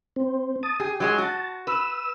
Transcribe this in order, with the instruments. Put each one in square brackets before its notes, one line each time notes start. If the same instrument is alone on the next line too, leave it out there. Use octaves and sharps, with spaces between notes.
[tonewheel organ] C4
A5 D#6
[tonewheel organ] G4 [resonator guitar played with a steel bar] G#4
[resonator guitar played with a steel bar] F#3 G#3 G#4
[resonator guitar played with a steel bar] F#4 [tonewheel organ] A5
[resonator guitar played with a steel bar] B4 [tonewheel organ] E6